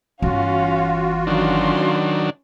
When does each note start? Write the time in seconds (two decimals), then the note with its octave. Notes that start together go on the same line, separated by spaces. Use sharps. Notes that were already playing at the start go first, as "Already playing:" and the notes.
0.22 G1 E3 C#4 F4 F#4 F5
1.27 D#3 F#3 C#4 D4 C6